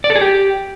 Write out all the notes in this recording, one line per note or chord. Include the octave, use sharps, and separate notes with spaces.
D5
A4
G#4
G4